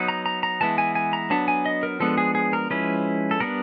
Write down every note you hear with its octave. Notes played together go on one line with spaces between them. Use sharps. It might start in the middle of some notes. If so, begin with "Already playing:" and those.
Already playing: F#3 B3 D#4
A#5
A#5
A#5
E3 G#3 B3 E4 A5
G#5
G#5
A#5
F#3 B3 D4 A5
G#5
D#5
A#4
F3 G#3 B3 D4 A4
G#4
G#4
A#4
F3 G#3 C#4 E4 B4
A4
G3 B3 D4 A#4